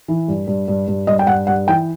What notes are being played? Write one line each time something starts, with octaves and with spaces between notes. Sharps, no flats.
E3
G2
G2
G2
G2
G2 D#5
G5
G2 F#5
G2 F#5
E3 G5